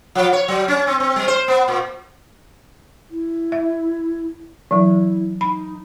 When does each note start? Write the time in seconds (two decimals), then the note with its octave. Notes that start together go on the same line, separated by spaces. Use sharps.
0.15 F3
0.33 C#5
0.48 F#3
0.68 C#4
0.87 C4
1.00 C4
1.16 G3
1.28 C5
1.48 B3
1.68 A#2
3.10 E4
3.52 E5
4.71 E3 F#3 E4
5.41 D#4 B5